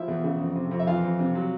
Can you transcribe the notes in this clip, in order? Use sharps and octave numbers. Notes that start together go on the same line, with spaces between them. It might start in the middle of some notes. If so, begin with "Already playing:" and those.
Already playing: F3 E4 E5
E2
C#3
F2
C3
F2
E5
E3 F4 F5
F2
C3
F#3